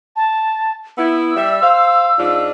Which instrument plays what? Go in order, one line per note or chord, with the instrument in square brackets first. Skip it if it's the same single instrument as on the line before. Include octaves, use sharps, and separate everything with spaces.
[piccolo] A5
[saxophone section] B3 E4 [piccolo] E6
[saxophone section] G3 E5
C5 F5
G#2 D4 F4